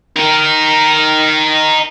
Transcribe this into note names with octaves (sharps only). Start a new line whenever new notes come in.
D#4 A#4